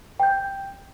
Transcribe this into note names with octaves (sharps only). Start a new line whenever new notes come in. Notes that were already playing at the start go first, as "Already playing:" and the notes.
G5 G6